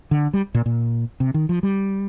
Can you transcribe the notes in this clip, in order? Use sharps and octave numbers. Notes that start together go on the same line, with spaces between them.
D3
G3
A#2
A#2
C3
D#3
F3
G3